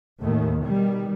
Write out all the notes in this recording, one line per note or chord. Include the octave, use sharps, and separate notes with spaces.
D#2 A2 D#3
B2 D#3 G3